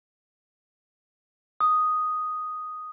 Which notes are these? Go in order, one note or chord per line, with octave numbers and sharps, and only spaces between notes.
D#6